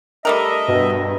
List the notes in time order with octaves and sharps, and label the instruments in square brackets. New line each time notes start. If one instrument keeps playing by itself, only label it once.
[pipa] G3 A3 A#4 [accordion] D#5 E5
[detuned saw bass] G2 [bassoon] B2